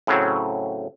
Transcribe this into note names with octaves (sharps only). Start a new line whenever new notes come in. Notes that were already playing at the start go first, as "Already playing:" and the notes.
A2 C#3 F#3 C4